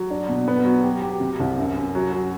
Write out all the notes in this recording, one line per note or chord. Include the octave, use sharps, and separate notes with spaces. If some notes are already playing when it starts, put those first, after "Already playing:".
Already playing: F#3
D4
B2
B3
F#3
G4
G4
C3
C2
F#2
F#2
F#3
F#3